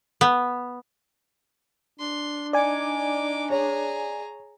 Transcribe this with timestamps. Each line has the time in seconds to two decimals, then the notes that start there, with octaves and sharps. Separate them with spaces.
0.21 B3
2.00 D4 C6
2.53 D#4 D5 G#5 D6
3.50 G#4 C#5 A#5